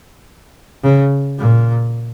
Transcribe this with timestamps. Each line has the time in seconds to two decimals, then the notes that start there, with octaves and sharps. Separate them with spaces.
0.83 C#3
1.38 A#2